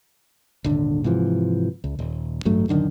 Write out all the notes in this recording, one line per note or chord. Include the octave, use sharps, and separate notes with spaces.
D#1 G#1 D3
G#2 C3 E3 F3
C#2
D#1
A1 G2 F#3 A3
D#1 F#2 D3 D#3